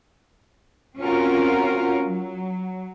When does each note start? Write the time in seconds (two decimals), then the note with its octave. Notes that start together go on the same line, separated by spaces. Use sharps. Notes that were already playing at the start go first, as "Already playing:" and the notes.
0.99 C4 C#4 F4 F#4 A#4
2.04 F#3